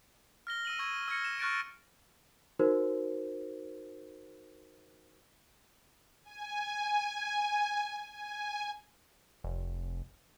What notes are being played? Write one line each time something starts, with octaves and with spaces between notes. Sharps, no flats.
F6 A#6 G7
E6 D#7 F#7
C#6 E6 G#6 D#7
E6 F6 G#6 A#6 C#7
E7
C#6 F6 F#6 A6 A#6 D7
D#4 F#4 A#4 C5
G#5
G#5
F1